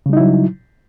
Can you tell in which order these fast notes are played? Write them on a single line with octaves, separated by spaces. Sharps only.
C#3 G3 D#4 E4 F#3